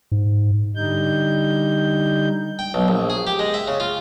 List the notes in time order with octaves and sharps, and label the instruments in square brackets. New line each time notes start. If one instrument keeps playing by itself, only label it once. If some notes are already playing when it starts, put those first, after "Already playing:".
[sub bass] G#2
[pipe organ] D3 G3 D#4 G6
[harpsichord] G5
B1
A#1
G#4
G4
G#3
E5
C#3
F4